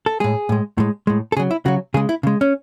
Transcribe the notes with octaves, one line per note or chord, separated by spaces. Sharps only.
A4
A2 G#3 G#4
A2 G#3
A2 G#3
A2 G#3
A4
C#3 F#3 G#4
E4
C#3 F#3 F#4
C#3 G#3 G#4
E4
C#3 G#3
C#4